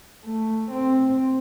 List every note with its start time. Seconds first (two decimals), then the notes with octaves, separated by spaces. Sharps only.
0.24 A3
0.71 C4